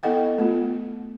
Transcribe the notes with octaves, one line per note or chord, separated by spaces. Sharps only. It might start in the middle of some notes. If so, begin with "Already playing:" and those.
B3 E4 A4 D#5 F#5 G5
A3 B3 F4